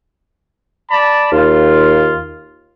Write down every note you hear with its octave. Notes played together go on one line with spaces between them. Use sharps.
D5 A5 B5
D#2 F4